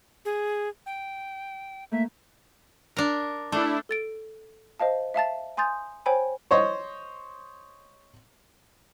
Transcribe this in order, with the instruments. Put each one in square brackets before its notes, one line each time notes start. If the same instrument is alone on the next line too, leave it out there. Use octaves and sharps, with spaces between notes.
[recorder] G#4
G5
[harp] A3 A#3 [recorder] E5
[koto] D4 A#4
[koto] A3 [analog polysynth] D4 E4
[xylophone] A4 A6 D7
C5 D#5 F5 A5
E5 F5 A5 A6
G#5 C6 D#6 G6 A6
C5 C#5 G5 G#5 B5
[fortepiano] C5 C#5 D#5